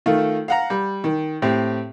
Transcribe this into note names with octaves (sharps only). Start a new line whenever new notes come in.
D#3 A3 F4
F5 F#5 A#5
G3
D#3
A2 C4 G4